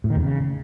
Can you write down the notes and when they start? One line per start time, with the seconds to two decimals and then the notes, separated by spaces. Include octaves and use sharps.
0.04 A2
0.10 D#3
0.16 E2
0.22 C#3